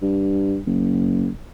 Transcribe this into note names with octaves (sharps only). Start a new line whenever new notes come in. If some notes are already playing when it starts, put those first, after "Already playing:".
G2
F#1